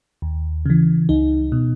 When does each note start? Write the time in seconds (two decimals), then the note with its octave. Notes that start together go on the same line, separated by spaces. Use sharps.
0.22 D#2
0.66 C#3 E3
1.09 C#2 D#4
1.52 B2